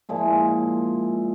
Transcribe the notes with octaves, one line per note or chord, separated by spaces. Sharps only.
A#2 F3 G#3 E4